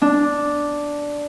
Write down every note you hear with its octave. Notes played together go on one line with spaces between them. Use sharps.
D4